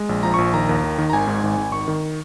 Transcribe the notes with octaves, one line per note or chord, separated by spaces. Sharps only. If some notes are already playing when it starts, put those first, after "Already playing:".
Already playing: G#3
A#1
F3 A#5
A#1 C#6
D#3 A#5
D#2
D#3
D#3
A#5
G#1 G#5
G#2
G#1
G#1
D#3 C#6
D#3